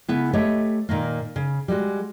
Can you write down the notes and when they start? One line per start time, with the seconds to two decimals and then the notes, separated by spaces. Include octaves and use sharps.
0.08 C#3 B3 E4
0.33 A3 G4 B4 C#5 D#5
0.89 A#2 D#3 A#3
1.36 C#3
1.68 G3 G#3 F#4